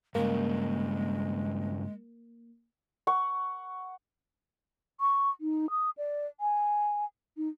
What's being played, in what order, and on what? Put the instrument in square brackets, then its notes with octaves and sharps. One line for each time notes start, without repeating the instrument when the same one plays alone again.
[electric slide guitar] G2 C#3 [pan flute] G#3 [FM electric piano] A#3
[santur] F#5 C#6
[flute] C#6
D#4
D#6
D5
G#5
D#4